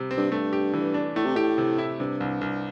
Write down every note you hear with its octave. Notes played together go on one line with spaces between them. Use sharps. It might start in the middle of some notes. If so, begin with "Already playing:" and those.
Already playing: C3 G3
C4
G2
G2 A3
G4
E3
D4
A2 A3
C3
A2 G4
C3
E4
G2 C3
C2
C2